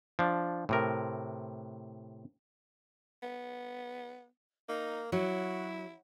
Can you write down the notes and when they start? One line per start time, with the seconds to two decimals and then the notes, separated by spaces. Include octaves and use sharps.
0.19 F3 D4
0.69 A2 C3 A#4
3.23 B3
4.69 A#3 D#4
5.12 F#3 E4 F#4